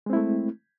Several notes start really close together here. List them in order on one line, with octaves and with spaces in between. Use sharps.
G#3 C4 E4 A3